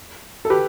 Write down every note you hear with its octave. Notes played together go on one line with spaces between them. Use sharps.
A4
G4 B4